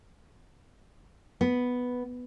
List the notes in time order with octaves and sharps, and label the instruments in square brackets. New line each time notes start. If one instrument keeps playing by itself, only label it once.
[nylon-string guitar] B3